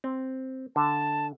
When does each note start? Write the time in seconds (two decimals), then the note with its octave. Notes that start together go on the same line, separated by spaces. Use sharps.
0.04 C4
0.76 D3 A5